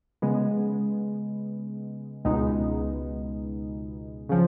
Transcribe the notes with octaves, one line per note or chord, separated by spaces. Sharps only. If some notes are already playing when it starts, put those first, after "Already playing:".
C#3 G#3 B3
C#2 B2 G#3 B3 D#4
C#3 F3